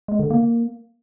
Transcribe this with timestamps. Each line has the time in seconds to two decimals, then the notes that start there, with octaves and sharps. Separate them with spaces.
0.08 G#3
0.19 D3
0.30 A#3